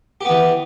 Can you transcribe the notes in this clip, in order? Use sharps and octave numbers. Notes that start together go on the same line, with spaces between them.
E3 B3 G4